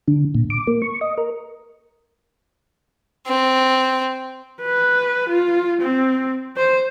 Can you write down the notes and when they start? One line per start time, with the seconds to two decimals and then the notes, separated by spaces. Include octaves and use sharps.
0.08 D3
0.35 A#2
0.50 D6
0.67 A#3
0.82 C#6
1.01 D#5
1.18 A#4
3.27 C4
4.61 B4
5.29 F4
5.81 C4
6.57 C5